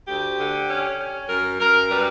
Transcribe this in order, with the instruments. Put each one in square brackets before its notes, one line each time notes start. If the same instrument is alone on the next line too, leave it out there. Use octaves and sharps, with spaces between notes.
[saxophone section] D2 G4
D3
C#4
C#4
F#2 A#4
F#2 A#4
G3 B4